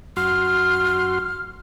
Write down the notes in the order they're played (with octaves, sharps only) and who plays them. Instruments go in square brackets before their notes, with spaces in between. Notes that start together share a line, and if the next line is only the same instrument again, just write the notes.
[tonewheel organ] F#2 F#4 C6 [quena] F6